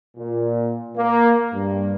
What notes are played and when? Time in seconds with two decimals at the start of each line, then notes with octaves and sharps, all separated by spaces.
0.16 A#2
0.96 A#3
1.53 G2